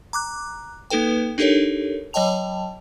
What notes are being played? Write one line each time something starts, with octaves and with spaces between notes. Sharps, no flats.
A#5 D6 F#6
A#3 D#4 A4 B4 G5
D4 D#4 G4 A4 A#4 C#5
F#3 C#5 D#5 G5 A5 F7